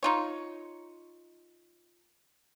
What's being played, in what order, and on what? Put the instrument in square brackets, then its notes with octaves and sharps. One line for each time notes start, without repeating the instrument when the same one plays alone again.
[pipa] D#4 F4 C#5